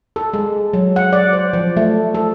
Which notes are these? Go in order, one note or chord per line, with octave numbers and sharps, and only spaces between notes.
A4
G#3
F#3
F#5
D5
C5
F3
A3
A4